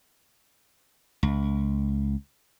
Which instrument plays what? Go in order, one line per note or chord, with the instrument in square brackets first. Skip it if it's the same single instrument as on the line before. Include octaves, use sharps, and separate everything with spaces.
[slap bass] C#2